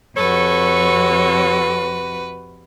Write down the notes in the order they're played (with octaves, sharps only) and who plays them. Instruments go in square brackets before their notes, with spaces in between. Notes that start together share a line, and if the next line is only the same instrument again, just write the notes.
[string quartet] F2 C3 F#4 [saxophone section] A4 C#5 [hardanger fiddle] B4